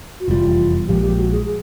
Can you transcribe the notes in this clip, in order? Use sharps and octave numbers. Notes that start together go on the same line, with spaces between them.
F#4
F1 E2 B2 G3 F4
A#1 A#2 F3 G#3 G4
G4
F#4
G#4